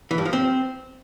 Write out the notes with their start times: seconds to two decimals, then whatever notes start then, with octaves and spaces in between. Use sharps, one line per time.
0.11 E3
0.18 G2
0.25 F3
0.33 C4